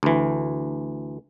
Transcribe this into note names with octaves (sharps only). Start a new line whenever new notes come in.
D2 E3